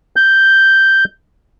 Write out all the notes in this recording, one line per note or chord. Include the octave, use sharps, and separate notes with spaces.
G6